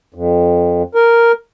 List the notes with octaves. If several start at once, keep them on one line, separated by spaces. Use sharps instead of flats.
F2
A#4